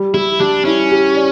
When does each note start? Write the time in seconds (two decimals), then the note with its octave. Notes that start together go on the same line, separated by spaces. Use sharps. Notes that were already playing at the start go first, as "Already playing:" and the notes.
Already playing: G3
0.14 G3 E4
0.40 G3 D4
0.65 C#4 E4
0.91 G4
1.16 D5